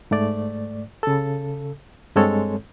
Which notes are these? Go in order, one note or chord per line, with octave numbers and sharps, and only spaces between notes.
G#2 A3 D5
C#3 A4
G2 G#3 C4 A4 C#5